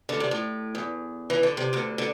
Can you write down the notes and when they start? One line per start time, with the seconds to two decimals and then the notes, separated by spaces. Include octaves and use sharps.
0.09 D2 D3
0.20 C3
0.31 A2
0.75 E2
1.30 E3
1.43 D3
1.57 C3
1.73 D2 D3
1.98 D3